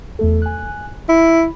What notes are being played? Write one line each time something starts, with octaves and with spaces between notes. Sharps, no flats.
E2 A3 A4
G#5 F#6
E4 B5